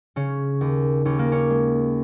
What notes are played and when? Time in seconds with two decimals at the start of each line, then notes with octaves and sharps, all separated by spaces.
0.16 C#3 C#4
0.61 D#2
1.05 D#2 C#4
1.19 A#3
1.32 C#4
1.50 G#3